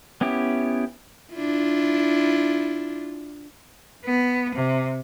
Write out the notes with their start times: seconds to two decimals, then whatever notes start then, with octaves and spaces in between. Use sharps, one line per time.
0.21 B3 C#4 E4 G4
1.33 D4 E4 F4
4.06 B3
4.55 C3